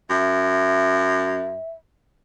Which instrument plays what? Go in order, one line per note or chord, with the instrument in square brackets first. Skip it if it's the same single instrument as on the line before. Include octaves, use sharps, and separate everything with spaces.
[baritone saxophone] F#2 [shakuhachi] E5